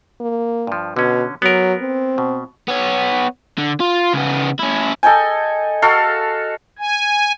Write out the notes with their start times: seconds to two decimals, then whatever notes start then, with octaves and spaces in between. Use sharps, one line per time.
0.21 A#3
0.67 G2 F3
0.96 B2 D3 C#4
1.42 F#3 B3 A#4
1.81 C4
2.18 B2
2.68 B3 C#5
3.58 D3
3.80 F4
4.13 C#3 B3
4.59 C#4 E4
5.03 A4 D#5 G5 G#5
5.82 F#4 A4 F5
6.79 G#5